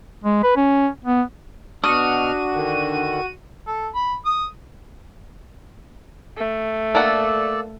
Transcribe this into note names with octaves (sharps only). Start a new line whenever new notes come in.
G#3
B4
C#4
B3
B2 D4 F#4 D#6 F6 D#7
D3 D#3
A4
B5
D#6
A3
A#3 D4 A4 D5 F#5 A5